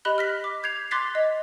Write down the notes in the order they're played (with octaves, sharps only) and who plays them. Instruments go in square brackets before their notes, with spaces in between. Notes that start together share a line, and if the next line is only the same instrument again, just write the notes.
[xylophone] G4 D#5 B5 F#6 G7
F6 A#6 B6
D6
G6 G#6 C7 F7
C6 D6 F#6 A6 B6 C7
D#5